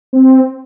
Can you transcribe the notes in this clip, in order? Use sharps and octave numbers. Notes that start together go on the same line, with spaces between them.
C4